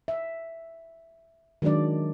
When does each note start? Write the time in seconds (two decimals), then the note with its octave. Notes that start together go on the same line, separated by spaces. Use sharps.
0.08 E5
1.62 D#3 F#3 G#3 D4 D5